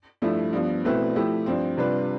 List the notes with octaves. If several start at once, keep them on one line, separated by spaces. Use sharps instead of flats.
G2 F3 A3 E4
G2 F3 B3
B2 A3 C4 E4 B4
F3 A3 E4 G4
G2 F3 C4
C3 G3 D4 F4 B4